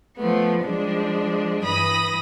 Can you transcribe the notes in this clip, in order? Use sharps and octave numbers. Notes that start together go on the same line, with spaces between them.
F3 A3 B3
F3 G3 G#3 D4
G2 E3 B5 D#6 A#6